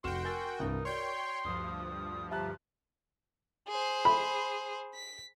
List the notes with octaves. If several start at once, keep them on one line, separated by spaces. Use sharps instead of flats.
F1 F#4 F#5 G5 C6 F6 E7
A#4 G#5 E6 A6
C2 G2 D#4
F#4 C#5 D5 G5 C6 C#7
D2 G2 F3 D#6
G4 E5 A5 A#5 F#6
G#4 C5
B5
B6